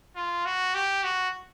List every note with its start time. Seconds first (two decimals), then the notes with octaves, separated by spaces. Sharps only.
0.16 F4
0.45 F#4
0.75 G4
1.04 F#4